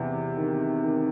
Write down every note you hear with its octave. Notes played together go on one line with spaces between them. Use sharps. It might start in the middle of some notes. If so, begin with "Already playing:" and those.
Already playing: E2 C3
D#3
D#3